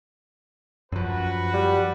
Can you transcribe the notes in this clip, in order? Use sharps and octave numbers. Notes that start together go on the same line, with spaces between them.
F#2 F3 F#4 B4
G3